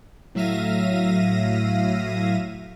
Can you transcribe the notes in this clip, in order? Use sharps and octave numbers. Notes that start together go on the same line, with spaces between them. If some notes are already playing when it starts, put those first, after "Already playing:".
A2 F#3 E5 F5 A#6 D#7